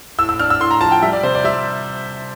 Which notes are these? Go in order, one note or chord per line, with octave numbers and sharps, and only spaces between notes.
A2 E6
E6
D4 F6
E6
A2 C6
A#5
F3 A5
G5
G3 E5
D5
C3 C5
D5
G3 E5